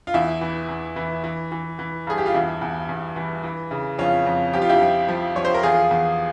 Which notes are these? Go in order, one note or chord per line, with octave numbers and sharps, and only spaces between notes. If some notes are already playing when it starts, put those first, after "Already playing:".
F4
E2 E4
E3
E2
E3
E3
E3
E3
G2 G#4
G4
F4
E2 E4
E2
E2
E3
E3
C#3
F2 C#4 F4
F2
F3 G4
F4
E4 G4
F3
F3
F3 C#5
C5
A#4
E2 F4 G#4
E2